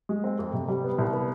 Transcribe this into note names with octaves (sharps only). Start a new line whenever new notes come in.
G#3
C4
F2
C3
G3
B3
C2
B3